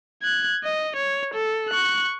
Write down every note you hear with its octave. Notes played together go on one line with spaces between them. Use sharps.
F#6 G#6
D#5
C#5
A4
C#6 F#6